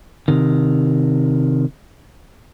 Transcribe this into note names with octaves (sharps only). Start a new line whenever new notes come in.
C3 D#3